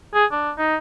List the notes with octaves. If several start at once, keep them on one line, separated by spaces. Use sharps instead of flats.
G#4
D4
D#4